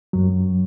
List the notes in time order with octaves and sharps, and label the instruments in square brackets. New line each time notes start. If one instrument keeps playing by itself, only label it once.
[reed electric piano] F#2 F#3